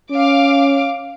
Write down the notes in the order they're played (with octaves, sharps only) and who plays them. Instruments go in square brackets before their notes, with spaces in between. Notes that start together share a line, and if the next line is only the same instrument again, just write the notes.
[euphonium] C#4 [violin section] F5 D6